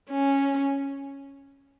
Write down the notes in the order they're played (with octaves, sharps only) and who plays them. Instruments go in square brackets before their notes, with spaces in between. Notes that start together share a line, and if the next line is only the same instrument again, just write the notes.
[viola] C#4